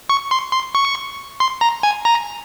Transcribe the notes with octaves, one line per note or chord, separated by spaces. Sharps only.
C#6
C6
C6
C#6
C6
A#5
G#5
A#5